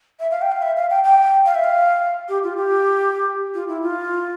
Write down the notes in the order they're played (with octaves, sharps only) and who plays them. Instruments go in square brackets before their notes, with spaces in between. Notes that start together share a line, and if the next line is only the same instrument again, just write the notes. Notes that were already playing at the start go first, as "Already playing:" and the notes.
[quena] E5
F5
G5
F5
E5
F5
G5
G5
F5
E5
F5
G4
F4
G4
F4
E4
F4